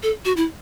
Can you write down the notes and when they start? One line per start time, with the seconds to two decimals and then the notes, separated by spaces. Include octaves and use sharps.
0.03 A4
0.25 F#4
0.37 E4